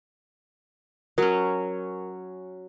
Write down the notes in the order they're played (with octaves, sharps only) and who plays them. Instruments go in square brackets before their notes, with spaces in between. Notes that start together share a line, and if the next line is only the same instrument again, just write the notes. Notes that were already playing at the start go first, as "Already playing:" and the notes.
[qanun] F#3 C#4 [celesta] A#4